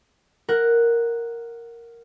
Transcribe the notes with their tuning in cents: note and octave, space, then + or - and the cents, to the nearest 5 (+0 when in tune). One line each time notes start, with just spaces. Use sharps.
A#4 +0 F#5 +0